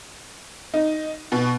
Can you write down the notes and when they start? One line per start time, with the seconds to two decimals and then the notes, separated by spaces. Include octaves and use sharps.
0.74 D#4
1.32 B2